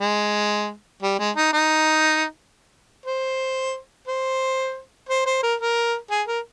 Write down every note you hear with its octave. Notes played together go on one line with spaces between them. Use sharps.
G#3
G3
G#3
D#4
D#4
C5
C5
C5
C5
A#4
A#4
G#4
A#4